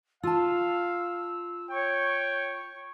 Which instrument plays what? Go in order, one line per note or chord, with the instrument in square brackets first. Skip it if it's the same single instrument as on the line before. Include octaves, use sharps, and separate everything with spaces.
[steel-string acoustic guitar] F4 A5 [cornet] F5 [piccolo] E6
[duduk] C#5 [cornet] G5 [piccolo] C#6